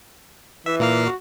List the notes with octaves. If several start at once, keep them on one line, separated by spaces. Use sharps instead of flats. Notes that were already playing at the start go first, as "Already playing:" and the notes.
E3 E5
A#2 A#3 F5
F#4